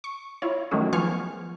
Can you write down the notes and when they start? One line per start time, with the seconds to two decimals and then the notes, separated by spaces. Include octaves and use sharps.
0.04 C#6
0.42 E4 F4 C#5
0.71 D#3 F#3 G#3 A3 C#4 G#4
0.93 F3 B3 G#4 C#6 F6